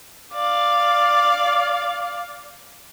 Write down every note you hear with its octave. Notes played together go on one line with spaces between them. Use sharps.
D5 F5